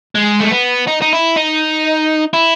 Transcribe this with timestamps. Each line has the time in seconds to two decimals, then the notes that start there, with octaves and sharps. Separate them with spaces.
0.15 G#3
0.40 A3
0.51 B3
0.88 D#4
1.02 D#4
1.13 E4
1.36 D#4
2.33 E4